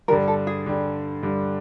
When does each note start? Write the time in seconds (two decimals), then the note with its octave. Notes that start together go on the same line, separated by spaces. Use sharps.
0.08 G2 D3 G3 A#4
0.28 A4
0.47 G#4
0.66 G2 D3 G3
1.23 G2 D3 G3